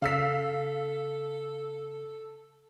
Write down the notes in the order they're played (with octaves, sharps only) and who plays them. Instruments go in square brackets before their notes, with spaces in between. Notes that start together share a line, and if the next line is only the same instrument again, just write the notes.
[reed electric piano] C#3 [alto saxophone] A4 [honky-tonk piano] F5 E6 B6